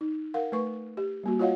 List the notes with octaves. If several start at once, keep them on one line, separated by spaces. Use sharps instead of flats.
D#4
A#4 F5 F#5
A3 B4 C#6
G4
G3 A#3 F#4
F4 F#4 C#5 D#5 F5 F#5